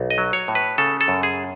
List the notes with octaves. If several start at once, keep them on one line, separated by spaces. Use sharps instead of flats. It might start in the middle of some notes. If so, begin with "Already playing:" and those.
Already playing: B1
D#5
F#3
C#5
A2
B4
C#3 A4
A4
F#2
G#4